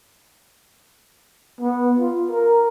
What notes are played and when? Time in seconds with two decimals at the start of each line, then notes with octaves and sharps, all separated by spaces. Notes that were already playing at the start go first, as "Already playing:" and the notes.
1.60 B3
1.99 F4
2.31 A#4